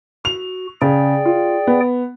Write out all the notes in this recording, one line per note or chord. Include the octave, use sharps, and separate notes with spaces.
F#4 F7
C#3 G#4 D5 G5
F4
B3